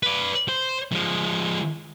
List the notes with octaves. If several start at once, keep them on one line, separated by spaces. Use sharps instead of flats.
B4 D5
C5
F3 G#3